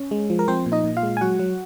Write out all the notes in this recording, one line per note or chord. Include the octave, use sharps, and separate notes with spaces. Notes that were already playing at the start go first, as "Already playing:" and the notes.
Already playing: C#4
G#3
F3
A#4
F3 C4 C5
A#2
D#4 D#5
A#2
F4 F5
G#3
G#5
F#3 F#4 F#5
F#3